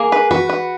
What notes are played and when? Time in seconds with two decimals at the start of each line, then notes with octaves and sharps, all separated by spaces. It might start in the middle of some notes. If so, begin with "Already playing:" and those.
Already playing: A#3 G#4
0.12 B4
0.31 F#4 B4
0.49 B4